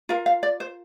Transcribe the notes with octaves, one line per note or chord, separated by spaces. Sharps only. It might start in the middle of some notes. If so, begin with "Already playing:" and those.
F4 A#4 F5
F5
D5
C5